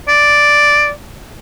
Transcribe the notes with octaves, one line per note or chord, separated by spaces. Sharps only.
D5